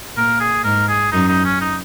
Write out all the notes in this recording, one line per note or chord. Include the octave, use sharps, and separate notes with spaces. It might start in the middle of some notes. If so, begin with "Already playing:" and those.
A#2 A#4
G#4
G#2 A#4
G#4
F#2 D#4
D#4
C#4
D#4